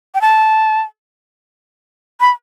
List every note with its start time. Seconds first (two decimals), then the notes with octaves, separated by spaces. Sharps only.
0.15 G5
0.21 A5
2.20 B5